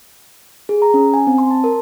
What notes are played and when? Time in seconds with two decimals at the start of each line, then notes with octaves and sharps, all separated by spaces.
0.69 G#4
0.82 A#5
0.94 C#4
1.14 G#5
1.27 C4
1.38 C6
1.51 A5
1.64 A#4